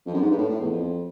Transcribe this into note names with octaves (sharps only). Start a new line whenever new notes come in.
F2
F#2
G#2
G2
A2
A2
E2
F2